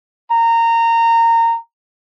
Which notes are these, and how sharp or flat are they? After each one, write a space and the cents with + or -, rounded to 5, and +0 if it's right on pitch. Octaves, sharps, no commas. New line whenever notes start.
A#5 -20